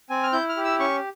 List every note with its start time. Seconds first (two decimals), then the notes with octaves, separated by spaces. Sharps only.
0.10 C4 G#5
0.23 F6
0.33 E4 G6
0.49 F6
0.57 G4
0.65 E6
0.79 C#4 C#6